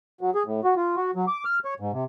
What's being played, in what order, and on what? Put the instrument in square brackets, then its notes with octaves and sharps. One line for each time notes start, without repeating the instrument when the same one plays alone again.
[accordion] F#3
G#4
A2
F#4
F4
F#4
F#3
D6
F6
C#5
G#2
C3